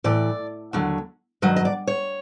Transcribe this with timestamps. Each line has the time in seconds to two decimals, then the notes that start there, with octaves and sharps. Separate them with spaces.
0.04 A2 E3 D5
0.73 D#2 D3 F#3
1.42 G2 D#3 F#3 D#5
1.56 D#5
1.65 D5
1.87 C#5